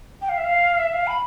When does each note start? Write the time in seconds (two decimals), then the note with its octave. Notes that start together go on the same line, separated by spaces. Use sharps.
0.22 G5
0.29 F5
0.37 E5
0.44 F5
0.78 E5
0.92 F5
1.07 B5